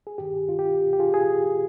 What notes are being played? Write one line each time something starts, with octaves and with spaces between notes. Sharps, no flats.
G#4
G2 D#3 G4
F4
G4
G4
F4 G#4
G#4